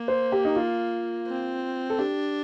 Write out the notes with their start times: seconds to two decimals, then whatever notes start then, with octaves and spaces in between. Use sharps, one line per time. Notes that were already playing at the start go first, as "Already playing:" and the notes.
Already playing: A#3
0.08 C5
0.32 G4
0.45 D#4
0.56 F4
1.28 C4
1.90 A4
1.99 D4 G4